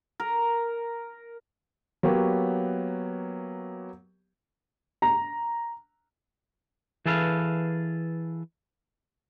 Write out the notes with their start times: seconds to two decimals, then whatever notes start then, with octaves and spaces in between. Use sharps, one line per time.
0.20 A#4
2.03 F#3 A#3 B3 G4 C#5
5.02 A#5
7.06 E3 G#4 A4 B4 F5